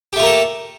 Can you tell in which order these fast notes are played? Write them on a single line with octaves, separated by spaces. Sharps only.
G4 A3 F4 A#3 A4